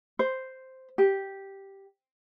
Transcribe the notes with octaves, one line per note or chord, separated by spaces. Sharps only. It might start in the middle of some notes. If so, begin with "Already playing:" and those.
C5
G4